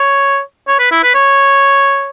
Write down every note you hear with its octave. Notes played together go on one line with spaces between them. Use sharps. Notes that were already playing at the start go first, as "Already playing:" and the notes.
Already playing: C#5
C#5
B4
E4
B4
C#5